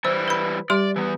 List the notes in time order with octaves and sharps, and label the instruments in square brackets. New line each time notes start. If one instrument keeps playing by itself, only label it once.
[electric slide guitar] E3 G3 E4 [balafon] C5
[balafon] B4 B5
[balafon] G3 G4 C6 [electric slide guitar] D5
[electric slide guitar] E3 B3